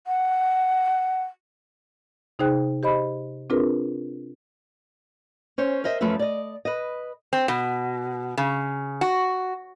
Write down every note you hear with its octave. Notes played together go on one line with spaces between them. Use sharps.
F#5
C3 D#4 G#4 C5 G5 F#6
G4 C5 D#5 B5
C4 D4 F4 G#4 A#4 B4
C#4 C5 C#5
A#4 C5 D#5 E5
F#2 F3 A3 A4 B4 E5
D5 D#5
B4 D#5
C4
B2
C#3
F#4